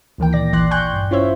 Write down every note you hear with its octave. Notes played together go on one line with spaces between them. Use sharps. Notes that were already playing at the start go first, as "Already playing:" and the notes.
D2 D#3 E3 A#3 A#4 G5
A#2 D5 A#6
A1 E3 D5 C6 F#6
G5 G#5 C6 C#6 F#6 G6
G2
C#4 E4 F4 C5 C#5 E5